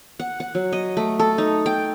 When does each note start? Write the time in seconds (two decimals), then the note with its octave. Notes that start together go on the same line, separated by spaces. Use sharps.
0.20 F#5
0.40 F#5
0.55 F#3
0.73 D#5
0.97 A3
1.19 A4
1.38 D#4
1.66 G5